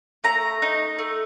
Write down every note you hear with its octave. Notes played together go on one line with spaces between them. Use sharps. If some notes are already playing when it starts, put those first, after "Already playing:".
A3 A#5
D#4
A3